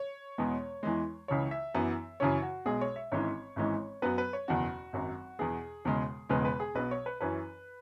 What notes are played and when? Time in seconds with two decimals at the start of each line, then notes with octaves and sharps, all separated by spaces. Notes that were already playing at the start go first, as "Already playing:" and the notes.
Already playing: C#5
0.38 E2 B2 G#3 B3
0.83 E2 E3 G#3
1.28 C#2 C#3 E3 C#5
1.51 E5
1.75 F#2 E3 B3
2.20 F#2 C#3 E3 C#4 C#5
2.42 F#4
2.65 B1 B2 G#3 G#4
2.81 C#5
2.96 E5
3.12 G#1 G#2 E3 G#3 C#4 C#5
3.56 G#1 G#2 E3 G#3 C#4
4.02 F#2 F#3 B3 B4
4.18 B4
4.33 C#5
4.48 F#1 E2 B2 F#4
4.93 G#1 F#2 F#3
5.39 E2 B2 B3 G#4
5.85 E1 E2 C#3 G#3
6.29 E1 E2 C#3 G#3 B3 B4
6.45 B4
6.60 G#4
6.75 B1 B2 B3 B4
6.91 C#5
7.06 B4
7.21 F#2 E3 C#4 B4